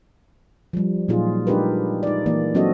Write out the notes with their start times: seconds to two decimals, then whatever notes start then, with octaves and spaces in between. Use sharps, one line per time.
0.73 F3 G3
1.08 A#2 F#3 D#4 F4 G#4
1.47 G#3 D4 D#4 G4 A#4 B4
2.03 D#4 D5
2.26 E3 A#3 D5
2.55 F#3 C4 D4 F#4 A4 D#5